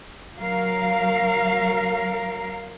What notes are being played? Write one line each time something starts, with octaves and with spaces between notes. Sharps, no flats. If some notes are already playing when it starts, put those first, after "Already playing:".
F#3 A#4 F5